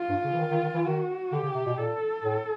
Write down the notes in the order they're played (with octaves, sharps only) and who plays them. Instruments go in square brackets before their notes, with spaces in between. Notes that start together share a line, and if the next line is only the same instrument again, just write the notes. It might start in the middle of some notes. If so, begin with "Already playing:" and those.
Already playing: [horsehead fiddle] F4
[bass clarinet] G2
C#3
E3
D#3
D#3
D#3
E3
[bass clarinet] D#3 [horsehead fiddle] F#4
[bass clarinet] D3 [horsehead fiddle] G4
[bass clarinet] C#3
C3
B2
[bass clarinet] A#2 [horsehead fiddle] A4
[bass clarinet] A2